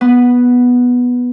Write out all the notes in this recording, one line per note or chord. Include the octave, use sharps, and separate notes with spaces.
B3